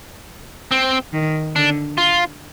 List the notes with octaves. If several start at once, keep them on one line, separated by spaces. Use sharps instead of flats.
C4
D#3
D3 D4
F4